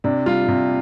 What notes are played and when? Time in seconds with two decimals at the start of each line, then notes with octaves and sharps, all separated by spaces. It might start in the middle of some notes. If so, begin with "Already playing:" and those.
0.04 C3 D4
0.26 G3 F4
0.48 C3